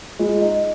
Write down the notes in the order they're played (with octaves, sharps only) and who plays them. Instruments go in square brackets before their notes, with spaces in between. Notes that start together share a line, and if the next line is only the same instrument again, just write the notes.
[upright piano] G#3 [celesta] F4
[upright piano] D#4